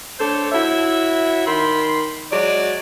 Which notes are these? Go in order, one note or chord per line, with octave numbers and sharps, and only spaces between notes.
A3 D4 A4 C5 C#5
E4 F#4 C#5 E5
D#3 B5 C6
F#3 G#3 F#4 D5